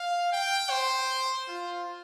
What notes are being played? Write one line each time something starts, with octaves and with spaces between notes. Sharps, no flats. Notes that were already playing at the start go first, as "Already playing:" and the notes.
Already playing: F5
G5
C5
F4